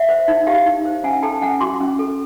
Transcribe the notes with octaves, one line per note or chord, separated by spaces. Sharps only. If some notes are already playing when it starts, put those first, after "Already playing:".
Already playing: E5 F#5
C5
D#4
G4 F5 G5
D#4
C5
C#4 F#5 G#5
A4 G5 A5
C#4 F#5 G#5
F#4 C6 D6
C#4
A4